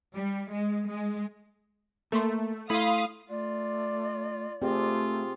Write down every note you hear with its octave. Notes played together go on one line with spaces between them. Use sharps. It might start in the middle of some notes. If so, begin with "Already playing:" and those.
G3
G#3
G#3
A3 A#3 C6
A3 E4 A4 F5 B5 C6 D#6
A3 F4 D5
A3 C4 F4 G4 G#4